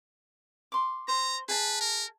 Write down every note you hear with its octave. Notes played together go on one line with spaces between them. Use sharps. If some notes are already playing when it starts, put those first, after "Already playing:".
C6 D6
C5 A#5
G#4 B4 A5
A#4